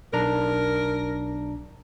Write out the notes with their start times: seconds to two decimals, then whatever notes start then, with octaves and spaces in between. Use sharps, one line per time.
0.13 B1 D4 A#4 A#5